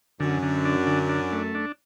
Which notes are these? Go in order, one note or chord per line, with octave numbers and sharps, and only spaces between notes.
F#2 D3
D3
D4
D3
D4
A3
D4